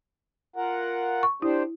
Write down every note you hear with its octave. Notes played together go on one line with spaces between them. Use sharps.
F4 A#4 F#5
C#6
D4 E4 G4 C5